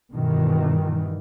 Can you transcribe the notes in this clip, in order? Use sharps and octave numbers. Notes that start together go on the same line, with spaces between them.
G2 B2 D#3 E3